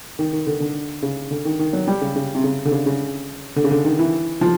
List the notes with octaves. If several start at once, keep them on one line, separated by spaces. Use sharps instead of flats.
D#3
D#3
D3
D3
C#3
D3
D#3
D#3
F#3
G3
C#3
C#3
C3
C#3
D3
C#3
C#3
D3
C#3
D3
D#3
E3
F3